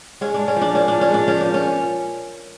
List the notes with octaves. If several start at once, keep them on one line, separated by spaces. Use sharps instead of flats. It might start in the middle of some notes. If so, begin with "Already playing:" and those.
G#3 C#4
G#3 D4
C#4
F3 D4
A#2 C#4
A#2 D4
C#4
G#3 D4
F3 C#4
A#2 D4
C#4